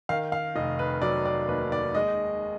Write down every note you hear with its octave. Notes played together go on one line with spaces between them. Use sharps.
D#3 F5
F5
F1 D#5
B4
F#3 D5
D5
D#2 B4
D5
G#3 D#5